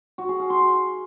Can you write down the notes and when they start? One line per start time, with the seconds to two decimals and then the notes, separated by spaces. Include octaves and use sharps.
0.18 F#4
0.29 G#4
0.39 F5
0.50 C6